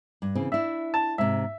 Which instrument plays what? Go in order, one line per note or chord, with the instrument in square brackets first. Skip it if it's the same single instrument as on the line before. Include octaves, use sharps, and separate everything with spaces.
[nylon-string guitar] G2
C#3 E3 C4
[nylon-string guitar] D4 E4 [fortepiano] E5
[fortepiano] A5
[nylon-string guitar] G#2 C3 [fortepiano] E5